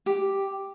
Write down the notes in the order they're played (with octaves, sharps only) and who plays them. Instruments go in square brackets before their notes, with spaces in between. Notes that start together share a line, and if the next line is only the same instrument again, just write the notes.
[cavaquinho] G4